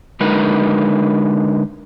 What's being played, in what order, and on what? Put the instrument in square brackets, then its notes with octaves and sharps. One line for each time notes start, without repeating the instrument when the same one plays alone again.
[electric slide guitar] D3 G#3 D#4 A#4 B4